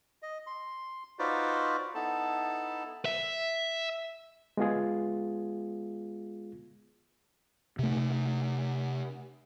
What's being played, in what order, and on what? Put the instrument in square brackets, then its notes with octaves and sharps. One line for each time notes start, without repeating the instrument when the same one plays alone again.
[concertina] D#5
C6
D#4 F4 F#4 B4 C5 D5
B3 D#4 E4 A4 A5
[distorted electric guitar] E5
[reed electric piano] G#3 B3 F4 G#4
[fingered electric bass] C3 A3